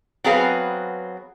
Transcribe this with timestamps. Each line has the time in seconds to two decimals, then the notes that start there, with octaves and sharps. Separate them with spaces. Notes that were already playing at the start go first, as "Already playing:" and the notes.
0.24 F#3 B3 C4 G#4 B4 F5